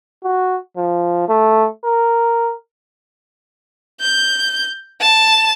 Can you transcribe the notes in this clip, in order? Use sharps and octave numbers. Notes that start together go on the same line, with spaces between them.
F#4
F3
A3
A#4
G6
A5